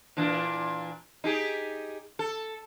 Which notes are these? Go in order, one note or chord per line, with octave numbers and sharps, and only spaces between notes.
A#2 E3 D4
D#4 G4 G#4
A4